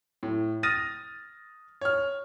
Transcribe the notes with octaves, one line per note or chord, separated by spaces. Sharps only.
A2
D#6 F6 A6 A#6 D#7
C#5 F6